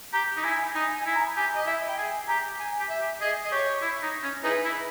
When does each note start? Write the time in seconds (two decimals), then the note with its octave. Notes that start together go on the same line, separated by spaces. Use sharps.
0.13 G4 A#5
0.37 D#4
0.44 E4 G#5
0.75 D#4 G#5
0.96 G#5
1.06 E4
1.16 A#5
1.36 G4 G#5
1.56 D#5
1.67 E4 E5
1.89 G5
1.98 G#4 G#5
2.28 G4 A#5
2.60 G#5
2.80 G4
2.90 E5
3.01 G4
3.21 G#4 D#5
3.45 D#5
3.52 G4 C#5
3.82 E4
4.03 D#4
4.23 C#4
4.44 D#4 E4 G#4 B4
4.65 E4